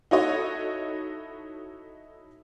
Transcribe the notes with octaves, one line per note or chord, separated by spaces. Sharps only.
D#4 E4 F#4 A4 C#5 D#5